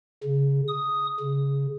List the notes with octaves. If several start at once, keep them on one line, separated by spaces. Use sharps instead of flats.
C#3
D#6
C#3